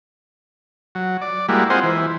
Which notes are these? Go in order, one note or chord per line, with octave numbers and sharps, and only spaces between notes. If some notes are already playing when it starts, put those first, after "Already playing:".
F#3
D5
G3 G#3 A#3 E4 F#4
C4 F4 G#4 C5 D#5 F#5
E3